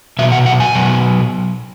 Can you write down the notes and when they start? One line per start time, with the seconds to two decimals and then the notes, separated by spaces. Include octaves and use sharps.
0.19 B2 F#3 E5
0.32 F#5
0.46 F#5
0.60 G#5
0.75 B2 F#3